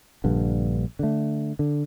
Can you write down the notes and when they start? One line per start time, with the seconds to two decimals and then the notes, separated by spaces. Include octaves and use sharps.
0.24 A#1 G2 D3
0.99 D3 A3
1.59 D3